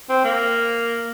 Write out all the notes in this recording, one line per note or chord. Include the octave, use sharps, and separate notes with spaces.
C4
A#3